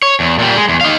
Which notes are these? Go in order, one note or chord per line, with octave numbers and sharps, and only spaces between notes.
C#5
E2
A#2 G3
G#3
E2
D#4 F5